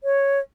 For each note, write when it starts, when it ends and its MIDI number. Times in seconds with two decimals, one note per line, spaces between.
0.04 0.39 73